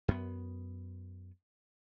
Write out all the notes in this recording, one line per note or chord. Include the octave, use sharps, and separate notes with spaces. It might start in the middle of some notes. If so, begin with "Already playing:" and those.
F#2 B3